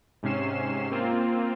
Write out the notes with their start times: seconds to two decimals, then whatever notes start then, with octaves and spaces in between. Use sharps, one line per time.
0.23 G#2 C3 C#4 C7 E7
0.91 A#3 C4 F4